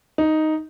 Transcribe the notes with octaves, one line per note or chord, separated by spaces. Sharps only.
D#4